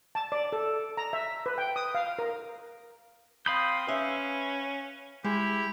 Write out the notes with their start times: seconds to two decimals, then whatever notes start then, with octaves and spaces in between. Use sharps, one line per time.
0.15 A5
0.32 D5
0.53 A4
0.97 A#5
1.13 E5
1.46 B4
1.58 G5
1.76 D#6
1.95 F5
2.19 A#4
3.46 C4 F5 B5 D#6 G6
3.88 C#4 B4 E5
5.24 G#3 E4 G4